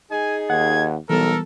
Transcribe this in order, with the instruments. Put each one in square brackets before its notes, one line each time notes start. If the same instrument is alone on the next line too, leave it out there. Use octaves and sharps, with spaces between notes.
[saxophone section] D#4 G#4 [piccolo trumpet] G#5
[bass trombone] D#2 [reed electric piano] F#5 [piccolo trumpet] G#6
[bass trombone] B1 [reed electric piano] E3 G3 B3 [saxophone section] A4 [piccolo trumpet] A#4